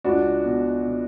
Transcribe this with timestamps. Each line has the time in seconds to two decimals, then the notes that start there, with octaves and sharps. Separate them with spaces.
0.04 C#2 D4 F#4
0.44 B2
0.85 B2